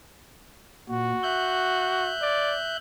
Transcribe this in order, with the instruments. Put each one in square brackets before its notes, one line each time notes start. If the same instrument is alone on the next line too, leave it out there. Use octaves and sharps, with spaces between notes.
[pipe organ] A#2 [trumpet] F#4
[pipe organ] E5 F#6 G6
[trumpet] D5